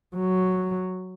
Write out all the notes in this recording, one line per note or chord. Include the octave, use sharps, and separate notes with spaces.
F#3